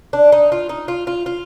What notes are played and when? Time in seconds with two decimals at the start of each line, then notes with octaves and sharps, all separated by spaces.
0.13 D4
0.32 D#4
0.52 F4
0.69 D#4
0.88 F4
1.07 F4
1.26 F4